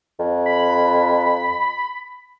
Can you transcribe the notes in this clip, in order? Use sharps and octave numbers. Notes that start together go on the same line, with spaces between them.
F2
B5